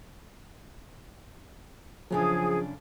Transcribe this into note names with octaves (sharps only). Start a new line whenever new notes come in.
F#2 C#3 F3 D4 G#4